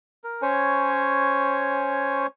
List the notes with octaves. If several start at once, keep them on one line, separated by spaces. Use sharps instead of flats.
A#4
C#4 C5 C#5 G#5